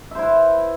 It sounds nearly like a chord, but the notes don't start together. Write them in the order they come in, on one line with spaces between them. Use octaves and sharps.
E5 C5 E4 B4